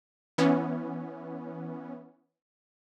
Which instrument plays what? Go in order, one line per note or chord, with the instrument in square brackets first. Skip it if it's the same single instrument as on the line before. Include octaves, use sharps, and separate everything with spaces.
[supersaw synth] E3 B3 C#4